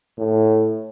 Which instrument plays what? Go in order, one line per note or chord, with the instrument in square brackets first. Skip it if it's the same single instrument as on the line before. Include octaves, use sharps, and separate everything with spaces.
[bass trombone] A2